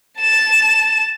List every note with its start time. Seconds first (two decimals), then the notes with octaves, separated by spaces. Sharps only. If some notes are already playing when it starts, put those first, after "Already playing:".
0.19 A5 E7